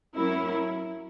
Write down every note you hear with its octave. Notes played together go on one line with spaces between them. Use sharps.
F#3 C#4 E4 A#4